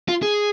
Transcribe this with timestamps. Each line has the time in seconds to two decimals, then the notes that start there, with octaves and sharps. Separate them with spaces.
0.08 F4
0.22 G#4